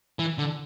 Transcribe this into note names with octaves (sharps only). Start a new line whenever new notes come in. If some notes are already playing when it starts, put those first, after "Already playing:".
E3
D3